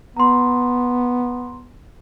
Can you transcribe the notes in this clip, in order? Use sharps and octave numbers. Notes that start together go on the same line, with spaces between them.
B3 A#5 C6